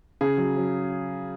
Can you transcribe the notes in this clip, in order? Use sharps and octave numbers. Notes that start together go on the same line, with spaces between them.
C#3 G#4
F#3
F#3